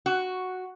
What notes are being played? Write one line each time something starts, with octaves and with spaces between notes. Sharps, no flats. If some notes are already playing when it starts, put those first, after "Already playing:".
F#4